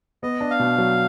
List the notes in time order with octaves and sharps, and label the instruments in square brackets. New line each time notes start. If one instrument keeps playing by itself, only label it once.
[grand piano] B3 [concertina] D#5
[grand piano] D4
[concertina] F5
[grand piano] B2
F#3